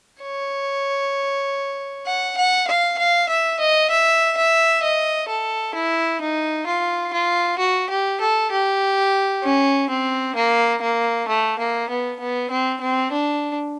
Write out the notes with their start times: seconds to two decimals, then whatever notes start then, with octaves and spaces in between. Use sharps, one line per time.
0.22 C#5
2.06 F#5
2.37 F#5
2.68 F5
2.98 F5
3.29 E5
3.59 D#5
3.90 E5
4.37 E5
4.83 D#5
5.29 A4
5.74 E4
6.21 D#4
6.67 F4
7.13 F4
7.59 F#4
7.90 G4
8.21 A4
8.51 G4
9.43 C#4
9.90 C4
10.35 A#3
10.82 A#3
11.28 A3
11.59 A#3
11.89 B3
12.20 B3
12.51 C4
12.81 C4
13.12 D4